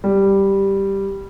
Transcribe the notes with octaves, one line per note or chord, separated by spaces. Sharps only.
G3